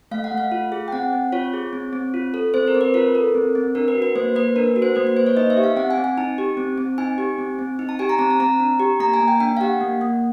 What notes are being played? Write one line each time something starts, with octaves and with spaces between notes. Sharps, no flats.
A3 F5
F#5
A3
F5
F4
G#4
G5
C4 F#5
C4
F4 C#5
G#4
C4
C4
F4
A4
C4 C5
A#4
C4
B4
F4 A#4
A4
C4
C4
D4 A#4
B4
F#4
B4
A#3 C5
A#3 B4
D4 A#4
F#4
C5
A#3 B4
B4
A#3 C5
C#5
D#4 D#5
E5
G4
F5
C4 F#5
G#5
C4
G#5
D#4 A5
G4
C4
C4
D#4 G#5
G4
C4
C4
D#4
A5
G4 G#5
A#5
C4 A5
A5
C4 A#5
D4
G4
A#3 A#5
G#5
A#3
G5
D4 G5
F5
G4 F#5
A#3
A#3